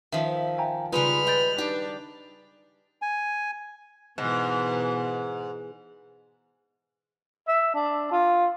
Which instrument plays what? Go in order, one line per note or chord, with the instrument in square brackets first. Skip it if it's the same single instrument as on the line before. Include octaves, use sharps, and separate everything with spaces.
[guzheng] D#3 F3 [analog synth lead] E5
[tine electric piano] G5 G#5 A#5
[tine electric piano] C#3 F4 [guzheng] G3 G#3 D#4 [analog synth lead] B4 [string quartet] B5 F6
[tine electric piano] D#5 G6 A6 [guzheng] G5
[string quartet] D4 [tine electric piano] D#4 [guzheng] G4
[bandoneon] G#5
[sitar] G#2 [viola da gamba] B2 E3
[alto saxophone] E5
D4
F4